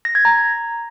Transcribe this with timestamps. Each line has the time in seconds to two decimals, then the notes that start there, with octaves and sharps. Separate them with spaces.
0.05 A#6
0.15 G#6
0.25 A#5